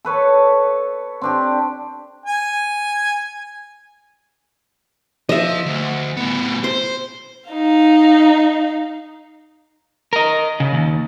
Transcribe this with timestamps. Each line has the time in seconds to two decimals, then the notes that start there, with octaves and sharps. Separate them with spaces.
0.05 A4 B4 C#5
1.22 C4 D4 G4
2.26 G#5
5.29 F3 D#5 E5
5.66 D2
6.17 A2 B3
6.64 C5 C6
7.50 D#4 F5
10.13 A#4 D#5
10.60 C#3
10.74 D#2